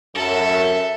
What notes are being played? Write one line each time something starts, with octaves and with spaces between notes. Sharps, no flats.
F#2 A4 E5